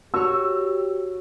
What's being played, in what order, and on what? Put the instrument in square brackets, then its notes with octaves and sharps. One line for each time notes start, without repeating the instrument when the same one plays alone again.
[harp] F#4 C#5 [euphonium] G4 [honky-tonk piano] E6